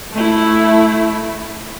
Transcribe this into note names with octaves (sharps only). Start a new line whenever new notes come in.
A3 E4